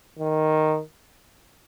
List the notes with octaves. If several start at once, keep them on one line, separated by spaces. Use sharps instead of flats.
D#3